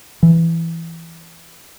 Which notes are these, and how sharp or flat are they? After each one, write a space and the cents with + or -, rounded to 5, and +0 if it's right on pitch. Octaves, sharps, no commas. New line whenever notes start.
E3 +5